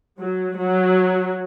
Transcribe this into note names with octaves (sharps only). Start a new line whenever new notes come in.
F#3
F#3